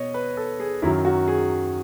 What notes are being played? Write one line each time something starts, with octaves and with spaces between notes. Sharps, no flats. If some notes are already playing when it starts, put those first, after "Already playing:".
Already playing: B2 C#5 D#5
B4
A4
G#4
F#2 D#3 F#3 E4
F#4
G#4